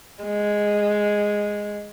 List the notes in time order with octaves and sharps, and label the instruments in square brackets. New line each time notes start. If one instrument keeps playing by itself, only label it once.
[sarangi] G#3